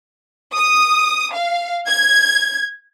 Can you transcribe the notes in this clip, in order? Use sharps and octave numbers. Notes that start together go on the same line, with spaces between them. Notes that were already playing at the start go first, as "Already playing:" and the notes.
D#6
F5
G#6